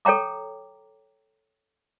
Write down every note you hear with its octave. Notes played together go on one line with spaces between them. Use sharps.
A4 C#5 G5 A#5 D6